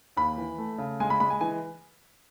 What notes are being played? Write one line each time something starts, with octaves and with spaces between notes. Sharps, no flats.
D#2 B5
E3
A3
C#3
G#3 G#5
B5
G#3 B5
G#5
E3 G#5